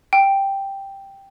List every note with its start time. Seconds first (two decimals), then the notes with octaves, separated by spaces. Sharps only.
0.13 G5